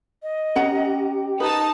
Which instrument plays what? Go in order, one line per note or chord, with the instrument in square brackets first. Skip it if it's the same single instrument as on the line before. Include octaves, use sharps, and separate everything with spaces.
[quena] D#5
[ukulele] C#4 F#5 A#5 [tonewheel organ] G4
[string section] D#4 A5 [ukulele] B4 [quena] D#6